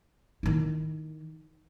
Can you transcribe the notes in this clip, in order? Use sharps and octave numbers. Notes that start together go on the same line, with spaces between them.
D#3 E4